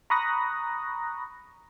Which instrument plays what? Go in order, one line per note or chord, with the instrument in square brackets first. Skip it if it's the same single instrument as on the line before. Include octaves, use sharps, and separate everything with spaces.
[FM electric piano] A#5 B5 C#6 D#6 F#6 A#6